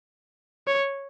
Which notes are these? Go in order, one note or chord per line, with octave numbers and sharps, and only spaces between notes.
C#5